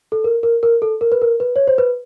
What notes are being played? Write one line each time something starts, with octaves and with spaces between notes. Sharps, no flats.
A4
A#4
A#4
A#4
A4
A#4
B4
A#4
B4
C#5
C5
B4